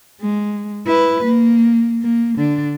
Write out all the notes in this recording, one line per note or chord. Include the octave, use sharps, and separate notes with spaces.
G#3
E4 B4
A#3
A#3
D3 D4